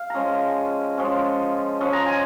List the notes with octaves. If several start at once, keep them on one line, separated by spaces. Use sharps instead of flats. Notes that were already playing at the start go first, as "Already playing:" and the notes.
Already playing: F5
F3 G#3 C#4 G#5 A#5
F3 G#3 C#4
F3 G#3 C#4
A#5
G#5